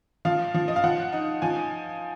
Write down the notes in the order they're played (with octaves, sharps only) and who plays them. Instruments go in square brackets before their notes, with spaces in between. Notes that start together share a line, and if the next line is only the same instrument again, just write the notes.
[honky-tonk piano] F3 F5
F3
D#5
F5
F3 F#5
D#4
F3 G#5